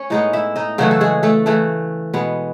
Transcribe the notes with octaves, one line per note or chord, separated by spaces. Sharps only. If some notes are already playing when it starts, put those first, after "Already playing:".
Already playing: C#4 C#5
A2 G#3 B3 D#4 D#5
E4 E5
D#4 D#5
C#3 E3 F#3 A3 F#4
A4
G#3 G#4
A3 A4
C#3 E3 A3
B2 G#3 B3